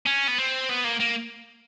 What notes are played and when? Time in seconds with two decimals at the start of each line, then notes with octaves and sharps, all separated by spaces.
0.06 C#4
0.28 B3
0.38 C4
0.69 B3
0.84 A#3
1.00 A#3